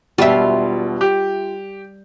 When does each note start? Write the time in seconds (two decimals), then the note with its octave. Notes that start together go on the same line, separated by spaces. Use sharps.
0.18 E1 B2 G3 F4 E5
1.01 G4